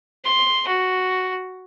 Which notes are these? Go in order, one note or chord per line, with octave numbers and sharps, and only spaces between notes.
C6
F#4